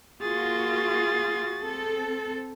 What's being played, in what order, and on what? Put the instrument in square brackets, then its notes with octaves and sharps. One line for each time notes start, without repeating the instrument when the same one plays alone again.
[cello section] A#3 F4 F#4 [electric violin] G#4 A6
[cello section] C4 A4